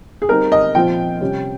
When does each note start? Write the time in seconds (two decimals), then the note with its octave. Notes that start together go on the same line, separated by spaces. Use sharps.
0.22 G#4
0.29 G3 C4 D#4 A#4
0.52 D#5
0.75 A#2 F3 C4 F4 G5
1.21 C3 G3 C#4